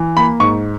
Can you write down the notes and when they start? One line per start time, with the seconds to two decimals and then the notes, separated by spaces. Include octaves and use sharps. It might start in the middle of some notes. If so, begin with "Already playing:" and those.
Already playing: E3
0.17 A#3 B5
0.40 G#2 C#6